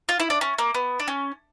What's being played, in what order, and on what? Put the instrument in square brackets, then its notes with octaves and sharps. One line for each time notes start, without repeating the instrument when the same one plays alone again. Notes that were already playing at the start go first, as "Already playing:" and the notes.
[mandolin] F4
E4
D4
C#4
A#3
B3
D4
C#4